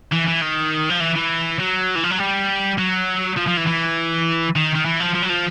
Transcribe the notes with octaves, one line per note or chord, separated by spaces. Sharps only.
E3
E3
D#3
F3
E3
E3
F#3
E3
F3
F#3
G3
F#3
F3
F3
E3
E3
D#3
D#3
E3
F3
F3
F#3
F3